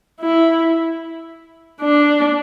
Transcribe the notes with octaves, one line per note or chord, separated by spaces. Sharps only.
E4
D4